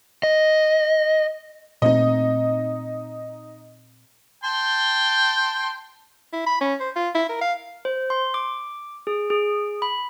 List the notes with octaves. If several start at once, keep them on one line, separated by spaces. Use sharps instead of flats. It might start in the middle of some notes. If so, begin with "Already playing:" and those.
D#5
A#2 A3 C4 D#4 D#5
G5 A5 C6
E4
B5
C#4
C5
F4
E4
A#4
F5
C5
C6
D6
G#4
G#4
B5